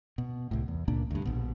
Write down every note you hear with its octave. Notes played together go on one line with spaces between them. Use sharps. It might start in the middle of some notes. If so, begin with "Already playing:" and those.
B2
C2 A2
E2
C#2 A#2 A#3 D4
D2 G2
A#1 B2